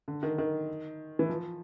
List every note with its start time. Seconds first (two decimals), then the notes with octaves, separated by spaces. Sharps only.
0.08 D3
0.23 D#3
0.38 D#3
1.19 E3
1.29 F3